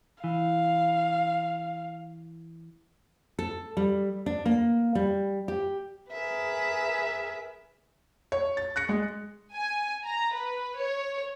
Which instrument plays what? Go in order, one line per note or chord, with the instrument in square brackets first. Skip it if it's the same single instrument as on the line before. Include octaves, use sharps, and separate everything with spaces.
[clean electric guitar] E3 [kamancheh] F5
[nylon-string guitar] A4
G3
D4
A#3
G3
G4
[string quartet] G#4 A#4 B4 E5
[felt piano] C#5
A6
F#6 A#6 C#7
G#3
[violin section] G#5
A#5
B4
C#5